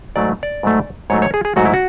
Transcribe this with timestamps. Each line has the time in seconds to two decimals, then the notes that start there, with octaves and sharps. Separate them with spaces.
0.16 G#2 F#3 A3 D5
0.43 D5
0.63 G#2 F#3 A3
1.10 G#2 F#3 A3 C#5
1.22 C#5
1.34 G#4
1.45 G#4
1.56 G#2 F#3 A3 F#4
1.65 E4
1.74 F#4